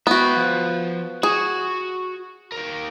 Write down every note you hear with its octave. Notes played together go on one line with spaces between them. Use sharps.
B3 F#4 E5 G5
F3
F#4 G#4
D#2 A#4